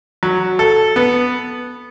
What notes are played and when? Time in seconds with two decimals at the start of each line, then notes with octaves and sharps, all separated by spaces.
0.23 F#3
0.59 A4
0.96 B3